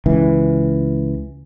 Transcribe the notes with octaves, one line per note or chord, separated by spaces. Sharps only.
C#2 E3